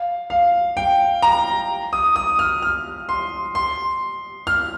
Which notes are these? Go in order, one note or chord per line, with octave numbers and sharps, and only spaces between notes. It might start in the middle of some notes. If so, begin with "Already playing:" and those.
Already playing: F5
F5
G5
A#5
D#6
D#6
F6
F6
C6
C6
F6